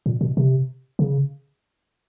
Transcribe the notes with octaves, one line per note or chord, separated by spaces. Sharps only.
A#2
B2
C3
C#3